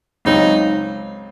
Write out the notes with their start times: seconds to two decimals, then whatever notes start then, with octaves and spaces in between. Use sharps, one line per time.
0.25 C#2 C#3 F#3 C4 D#4